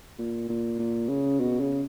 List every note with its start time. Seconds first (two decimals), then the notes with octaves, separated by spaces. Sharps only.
0.19 A#2
0.49 A#2
0.79 A#2
1.09 C#3
1.40 B2
1.60 C#3